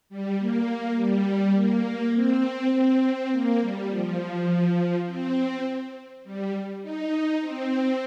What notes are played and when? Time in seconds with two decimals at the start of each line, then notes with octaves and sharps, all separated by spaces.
0.10 G3
0.39 A#3
0.97 G3
1.56 A#3
2.14 C4
2.73 C4
3.32 A#3
3.61 G3
3.89 F3
5.06 C4
6.24 G3
6.82 D#4
7.41 C4